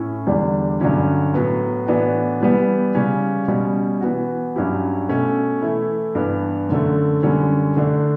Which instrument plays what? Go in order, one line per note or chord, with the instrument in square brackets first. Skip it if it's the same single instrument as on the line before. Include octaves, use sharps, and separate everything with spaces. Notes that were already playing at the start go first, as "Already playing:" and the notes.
Already playing: [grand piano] A2 C#4 E4
E2 D3 G3 D4
G2 D3 F#3 C#4 E4
A2 F#3 B3
A2 E3 B3 D4 F#4
E3 G3 B3
C#3 G3 C#4
B2 G3 C#4
E3 B3 F#4
G2 F#3 C#4 E4 G4
B2 A3 C#4
E3 A3 E4
G2 E3 B3
F#2 D3 A3
F#2 D3 G3 C#4
D3 A3 D4